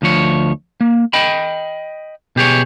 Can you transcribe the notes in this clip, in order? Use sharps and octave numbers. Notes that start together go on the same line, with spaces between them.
D2 F3 C#5
A#3
D#5 G5 B5
B2 G4 G#4 C#5